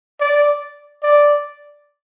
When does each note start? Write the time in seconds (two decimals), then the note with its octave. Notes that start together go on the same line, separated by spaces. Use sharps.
0.20 D5
1.03 D5